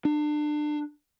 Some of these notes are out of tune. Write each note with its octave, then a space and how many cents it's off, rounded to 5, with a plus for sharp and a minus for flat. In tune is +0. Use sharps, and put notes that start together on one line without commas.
D4 +30